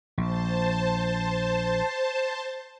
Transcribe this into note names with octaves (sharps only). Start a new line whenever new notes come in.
A#1 C5 A5